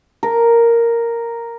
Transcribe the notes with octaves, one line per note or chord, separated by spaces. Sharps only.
A#4